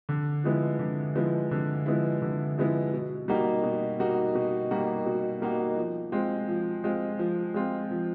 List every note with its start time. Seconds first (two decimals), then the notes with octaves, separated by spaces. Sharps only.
0.09 D3
0.44 F3 G#3 B3 E4
0.79 D3
1.15 F3 G#3 B3 E4
1.51 D3
1.86 F3 G#3 B3 E4
2.22 D3
2.58 F3 G#3 B3 E4
2.93 B2
3.28 G3 A#3 D#4 F#4
3.63 B2
4.00 G3 A#3 D#4 F#4
4.35 B2
4.71 G3 A#3 D#4 F#4
5.06 B2
5.42 G3 A#3 D#4 F#4
5.77 F3
6.12 G#3 C4 F4
6.49 F3
6.84 G#3 C4 F4
7.19 F3
7.54 G#3 C4 F4
7.91 F3